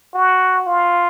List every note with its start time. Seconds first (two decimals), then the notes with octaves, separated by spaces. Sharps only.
0.14 F#4
0.66 F4